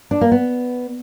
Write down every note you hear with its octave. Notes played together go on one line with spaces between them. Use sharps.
D4
A#3
B3